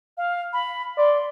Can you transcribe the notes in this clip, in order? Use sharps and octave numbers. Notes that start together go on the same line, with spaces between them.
F5
B5
D5 C6